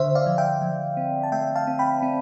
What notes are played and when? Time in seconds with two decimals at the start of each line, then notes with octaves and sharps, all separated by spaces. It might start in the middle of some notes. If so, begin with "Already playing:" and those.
Already playing: D3 C5 E5
0.15 D5 F5
0.26 F3
0.38 E5 G5
0.62 F3
0.97 C4
1.23 A5
1.32 A3 E5 G5
1.56 F5 A5
1.67 C4
1.79 G5 B5
2.02 C4